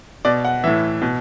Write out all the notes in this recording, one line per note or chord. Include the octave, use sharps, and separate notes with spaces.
B2 D5
F#5
A2 E3 E5
B2